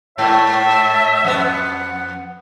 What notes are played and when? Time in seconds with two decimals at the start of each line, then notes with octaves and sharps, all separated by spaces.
0.18 G#2 C#5 E5 A5
1.25 F2 B3 F#5